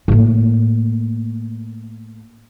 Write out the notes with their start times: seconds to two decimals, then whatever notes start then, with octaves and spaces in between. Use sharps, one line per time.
0.08 A2 A#3